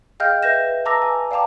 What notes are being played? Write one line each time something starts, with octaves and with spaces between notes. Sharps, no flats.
G#4 D#5 F5 G5 F6 G6
B4 E5 G6 A#6 E7
B4 A5 A#5 D6 E6 A#6
G#5
D5 F5 G5 A5 A#5 D6